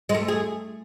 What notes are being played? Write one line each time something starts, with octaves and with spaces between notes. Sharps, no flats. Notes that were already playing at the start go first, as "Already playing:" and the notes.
G#3
A3
G#4